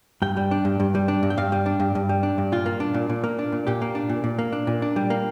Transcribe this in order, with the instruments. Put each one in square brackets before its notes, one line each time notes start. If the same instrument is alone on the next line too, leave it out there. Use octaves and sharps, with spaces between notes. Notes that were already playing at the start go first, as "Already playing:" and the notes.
[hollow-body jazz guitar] G2 G5
G3
D4
G2
G2
G3
D4
G2
G5
G2 F5
G3
D4
G2
G2
G3
D4
G2
A#2 F4
A#3
D4
A#2
A#2
A#3
D4
A#2
A#2 G4
A#3
D4
A#2
A#2
A#3
D4
A#2
D4
G3
A#3